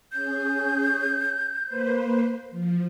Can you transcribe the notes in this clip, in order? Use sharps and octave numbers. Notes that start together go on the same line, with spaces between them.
C#4 G#4 G6
A#3 B4 C5
F3